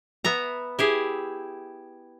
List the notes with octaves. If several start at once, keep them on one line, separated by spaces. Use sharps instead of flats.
B3 E5 A#5
E4 G4 G#4